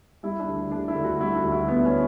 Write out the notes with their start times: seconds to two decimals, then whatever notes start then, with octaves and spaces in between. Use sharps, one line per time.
0.23 G3 E4
0.39 D4
0.48 D2
0.71 D3 D4
0.88 E4
0.95 D2
1.04 F#4
1.20 G3 E4
1.37 F#4
1.45 D2
1.52 E4
1.68 D3 B3
1.85 C#4